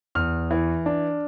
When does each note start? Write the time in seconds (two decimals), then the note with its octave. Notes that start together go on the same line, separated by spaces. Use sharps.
0.15 E2 F6
0.51 E3
0.86 D4